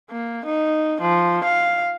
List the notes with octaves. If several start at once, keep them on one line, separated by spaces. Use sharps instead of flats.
A#3
D#4
F3
F5